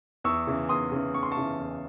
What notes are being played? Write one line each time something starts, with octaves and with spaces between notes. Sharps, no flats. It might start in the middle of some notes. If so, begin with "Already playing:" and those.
E2 C#6 E6
C#3 E3
E2 C6 D#6
C#3 E3
E2 C#6
C6
A5 C#6
C#3 E3
E2